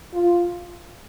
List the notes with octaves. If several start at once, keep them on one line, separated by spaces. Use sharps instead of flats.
F4